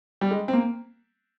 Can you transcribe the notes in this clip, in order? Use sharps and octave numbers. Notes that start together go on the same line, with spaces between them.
G3
G#3
C4
A#3